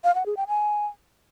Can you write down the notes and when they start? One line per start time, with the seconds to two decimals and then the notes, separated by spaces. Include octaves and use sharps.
0.04 F5
0.15 F#5
0.26 G#4
0.37 G5
0.48 G#5